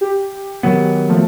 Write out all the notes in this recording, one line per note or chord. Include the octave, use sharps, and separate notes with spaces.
G4
D#3 F#3 B3
F3 A3